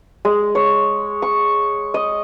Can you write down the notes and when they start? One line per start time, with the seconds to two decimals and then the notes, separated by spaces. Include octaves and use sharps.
0.25 G#3
0.55 C#5
1.22 C#6
1.94 D#5